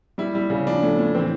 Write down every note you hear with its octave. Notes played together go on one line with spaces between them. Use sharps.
G3 E4
G3
C#3
F3 D4
A2
A2
E3 C4